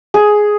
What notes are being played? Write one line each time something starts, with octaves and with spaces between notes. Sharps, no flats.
G#4